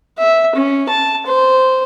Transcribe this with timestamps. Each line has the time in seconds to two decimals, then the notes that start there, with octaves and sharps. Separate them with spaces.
0.18 E5
0.55 C#4
0.89 A5
1.26 C5